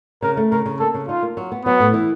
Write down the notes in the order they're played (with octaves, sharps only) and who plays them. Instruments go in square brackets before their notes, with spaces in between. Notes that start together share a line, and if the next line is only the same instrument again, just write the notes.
[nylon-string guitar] C#3 [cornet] A#4
[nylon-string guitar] A3
[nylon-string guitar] C#3 [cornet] A#4
[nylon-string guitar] C#3
[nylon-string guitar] A#3 [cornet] A4
[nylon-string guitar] C#3
[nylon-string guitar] D#4 [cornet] F4
[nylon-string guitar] A#3
F#3
B3
[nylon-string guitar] F#3 [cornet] B3
[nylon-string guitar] A2
E3